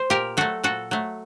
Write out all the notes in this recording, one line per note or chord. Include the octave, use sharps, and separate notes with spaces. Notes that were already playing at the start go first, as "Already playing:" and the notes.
Already playing: C5
A#2 G4 A#4
F#3 A3 F#4 A4
A#2 F#4 A4
F#3 A3